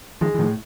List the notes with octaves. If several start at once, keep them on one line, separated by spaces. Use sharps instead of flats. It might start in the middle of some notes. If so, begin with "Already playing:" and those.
D#3 F3 G#3
E3
A2 D#3 F3